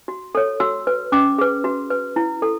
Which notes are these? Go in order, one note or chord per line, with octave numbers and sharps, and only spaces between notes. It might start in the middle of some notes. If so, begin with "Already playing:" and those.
F#4
A4 C#5
F#4 E6
B4
C#4 D6
G#4 B4
F#4
B4
E4
A4